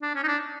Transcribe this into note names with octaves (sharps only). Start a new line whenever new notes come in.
D4
C#4
D#4
D4